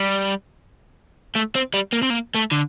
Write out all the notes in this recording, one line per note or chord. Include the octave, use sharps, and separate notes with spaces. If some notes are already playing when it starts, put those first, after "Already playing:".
Already playing: G3
A3
C4
G3
A#3
C4
A#3
A3
D3